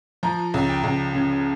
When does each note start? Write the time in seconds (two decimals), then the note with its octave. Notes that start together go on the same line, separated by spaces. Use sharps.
0.23 F3 A#5
0.54 C#2
0.69 G5
0.83 C#2
1.15 C#3